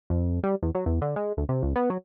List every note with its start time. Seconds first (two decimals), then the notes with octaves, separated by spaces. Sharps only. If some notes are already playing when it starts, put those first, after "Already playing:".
0.10 F2
0.43 G3
0.63 E2
0.75 F#3
0.86 E2
1.01 D3
1.16 G#3
1.37 D2
1.49 C3
1.63 C#2
1.76 B3
1.90 F#3